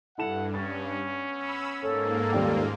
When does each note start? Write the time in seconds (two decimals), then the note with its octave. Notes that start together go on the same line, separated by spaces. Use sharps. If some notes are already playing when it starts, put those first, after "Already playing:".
0.18 G2 E4 A4 F#5 E7
0.54 B3 C#4 A6
1.34 B5 E6
1.83 G#2 A#3 A4 C#5
2.33 D#1 G3 F4 G5